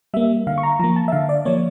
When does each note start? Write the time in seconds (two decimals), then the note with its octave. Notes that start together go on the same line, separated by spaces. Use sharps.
0.14 G3 A#3 E5
0.47 D3 F5
0.58 C#6
0.63 A#5
0.79 F3 A#5
0.84 A#3
0.96 A5
1.08 E5
1.12 D3 F5
1.29 D5
1.45 F3 A#3 C#5